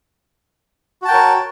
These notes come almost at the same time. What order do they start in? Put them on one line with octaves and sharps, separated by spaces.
F#4 A5 G5 A#4 C#5